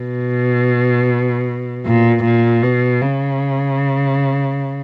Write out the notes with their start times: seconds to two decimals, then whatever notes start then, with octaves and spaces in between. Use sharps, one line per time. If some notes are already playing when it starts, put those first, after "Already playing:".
Already playing: B2
1.85 A#2
2.24 A#2
2.63 B2
3.02 C#3